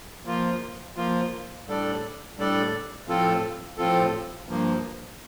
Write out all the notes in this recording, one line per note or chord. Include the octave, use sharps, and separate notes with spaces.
F3 A#3 F4
F3 A#3 F4
A2 G3 D4 A4 D5
A2 G3 D4 A4 D5
A2 F3 C4 F4 A4
A2 F3 C4 F4 A4
G2 F3 A#3